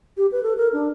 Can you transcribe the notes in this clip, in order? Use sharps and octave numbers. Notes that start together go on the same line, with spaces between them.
G4
B4
A4
A#4
D4